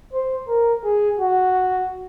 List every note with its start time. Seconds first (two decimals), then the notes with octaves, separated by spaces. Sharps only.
0.13 C5
0.48 A#4
0.84 G#4
1.19 F#4